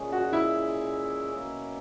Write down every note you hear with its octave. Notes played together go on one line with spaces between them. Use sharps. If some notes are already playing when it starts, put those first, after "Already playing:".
Already playing: A#2 G#3 C#4 G#4
F#4
E4
B2 A#3 C#4